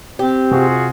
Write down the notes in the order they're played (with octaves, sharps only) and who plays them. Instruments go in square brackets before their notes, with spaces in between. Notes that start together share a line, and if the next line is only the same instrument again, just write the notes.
[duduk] C4 [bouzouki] G4
[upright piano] C3 [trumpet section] F4 F#4 G#4